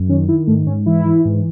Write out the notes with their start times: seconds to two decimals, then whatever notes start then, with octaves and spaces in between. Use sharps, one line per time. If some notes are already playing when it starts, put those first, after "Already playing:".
Already playing: F#2
0.09 D#3 C#4
0.28 D#3 E4
0.47 G#2 A3
0.67 G#2 C#4
0.86 E3 E4
1.06 E3
1.25 G#2